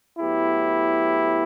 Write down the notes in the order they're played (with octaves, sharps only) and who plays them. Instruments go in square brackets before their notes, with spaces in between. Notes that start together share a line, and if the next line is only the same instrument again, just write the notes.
[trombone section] A2 F#3 B3 E4 G4